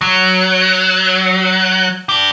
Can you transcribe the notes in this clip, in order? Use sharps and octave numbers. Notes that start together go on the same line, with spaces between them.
F#3
D4 G4